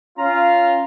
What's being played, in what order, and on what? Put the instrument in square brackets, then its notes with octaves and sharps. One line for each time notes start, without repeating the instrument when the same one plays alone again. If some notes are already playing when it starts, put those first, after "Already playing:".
[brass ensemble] C#4 F4 [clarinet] A#5